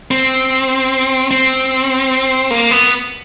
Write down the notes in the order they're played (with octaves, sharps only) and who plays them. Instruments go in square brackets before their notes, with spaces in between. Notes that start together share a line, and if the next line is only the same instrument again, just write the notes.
[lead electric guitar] C4
C4
A#3
B3